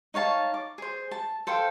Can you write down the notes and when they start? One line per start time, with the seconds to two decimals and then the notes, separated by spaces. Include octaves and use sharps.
0.14 D#4 C#5 F5 A5
0.54 D6
0.78 G#4 C5
1.11 A5
1.47 A4 C5 F5 G5